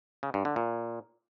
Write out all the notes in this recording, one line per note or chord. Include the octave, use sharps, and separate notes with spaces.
C#3
G2
D3
A#2